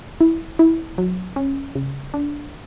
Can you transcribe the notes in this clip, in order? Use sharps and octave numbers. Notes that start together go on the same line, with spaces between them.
E4
E4
F#3
C#4
C#3
D4